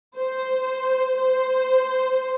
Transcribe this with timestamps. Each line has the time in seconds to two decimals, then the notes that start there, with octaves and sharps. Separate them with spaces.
0.16 C5
1.17 C5